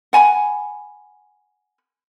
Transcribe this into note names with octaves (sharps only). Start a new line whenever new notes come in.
F#5 G#5 A#5 B5